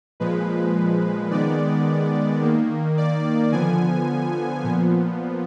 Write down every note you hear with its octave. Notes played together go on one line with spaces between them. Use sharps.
A#2 F3 G#3 B4
D#3 G#3 B3 D5
D#3 A#3
D5
D3 F3 B3 G#5
A#2 F3 B3